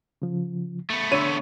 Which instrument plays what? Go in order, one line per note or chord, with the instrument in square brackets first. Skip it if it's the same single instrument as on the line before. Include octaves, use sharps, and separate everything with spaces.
[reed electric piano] C#3 F3
[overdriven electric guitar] A3 B3
[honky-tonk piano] D3 C#5 D#7 [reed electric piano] B5 C6 E6